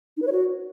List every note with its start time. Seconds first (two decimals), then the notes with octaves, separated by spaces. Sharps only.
0.17 D#4
0.22 B4
0.27 C#5
0.32 F#4